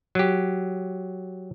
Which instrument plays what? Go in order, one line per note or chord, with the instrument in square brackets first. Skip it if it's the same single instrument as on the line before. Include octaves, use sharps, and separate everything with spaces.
[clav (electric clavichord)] F#3 G4